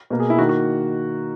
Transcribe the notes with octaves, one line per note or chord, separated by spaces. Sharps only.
B2 A#3
G#4
E4
D#3 A#3 F#4
F#4